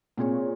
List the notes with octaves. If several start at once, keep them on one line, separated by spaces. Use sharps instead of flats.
A#2 C4 F4 G#4 C#5